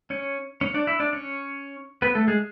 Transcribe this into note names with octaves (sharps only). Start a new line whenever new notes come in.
C#4 C#5
C#4 C#5
D4 D5
E4 E5
D4 D5
C#4 C#5
B3 B4
A3 A4
G#3 G#4